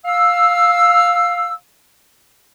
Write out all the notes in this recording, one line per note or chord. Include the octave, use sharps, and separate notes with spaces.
F5 E6